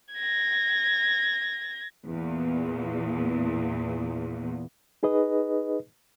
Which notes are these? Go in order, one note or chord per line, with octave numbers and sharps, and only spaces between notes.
G#6 A#6
E2 A#2
D#4 G#4 B4 D#5